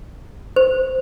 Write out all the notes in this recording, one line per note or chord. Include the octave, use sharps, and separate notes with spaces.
C5